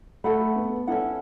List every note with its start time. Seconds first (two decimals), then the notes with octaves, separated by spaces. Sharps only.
0.24 A3 A4 F#5 B5
0.56 B3
0.87 C#4 E4 A4 F#5